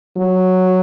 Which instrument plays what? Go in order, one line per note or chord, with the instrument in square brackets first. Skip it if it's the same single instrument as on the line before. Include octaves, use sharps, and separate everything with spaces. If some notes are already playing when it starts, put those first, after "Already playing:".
[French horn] F#3